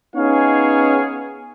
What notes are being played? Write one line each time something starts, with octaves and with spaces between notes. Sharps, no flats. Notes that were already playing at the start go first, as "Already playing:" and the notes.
B3 C#4 D#4 G#4 C#5 F5